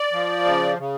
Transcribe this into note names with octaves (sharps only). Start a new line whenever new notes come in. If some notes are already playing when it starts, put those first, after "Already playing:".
Already playing: D5
F3
C#3
C#3